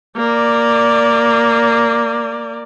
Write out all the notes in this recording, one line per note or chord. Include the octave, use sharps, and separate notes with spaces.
A#3 D5